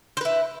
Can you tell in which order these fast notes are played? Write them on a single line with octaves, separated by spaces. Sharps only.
C5 B4 E4